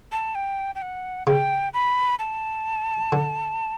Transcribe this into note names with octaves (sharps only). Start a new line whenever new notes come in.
A5
G5
G5
F#5
C#3 G5
B5
A5
D3